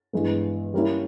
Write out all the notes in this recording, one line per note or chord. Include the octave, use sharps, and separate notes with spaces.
G2 E3 G#3 B3
G3 A#3 C#4 E4